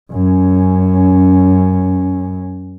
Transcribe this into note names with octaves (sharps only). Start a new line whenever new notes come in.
F#2 C#4